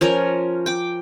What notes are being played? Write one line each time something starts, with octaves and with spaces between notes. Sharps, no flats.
F3 C#4 A#4
G5 D6